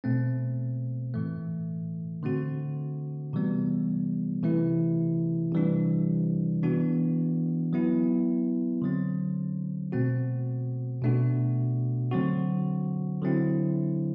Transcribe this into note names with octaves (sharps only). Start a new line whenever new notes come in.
B2 A3 C4
A2 E3 A3
D3 A3 C4 F#4
C3 E3 G3 B3
C3 E3 A3 E4
C3 E3 G3 D4
E3 B3 D4 F#4
F#3 B3 E4
D3 F#3 C4
B2 A3 C4 F#4
B2 A3 D4 F#4
D3 F#3 C4 F#4
D3 F#3 C4 E4